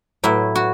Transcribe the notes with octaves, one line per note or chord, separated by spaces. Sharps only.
A2 F#3 E4
F#4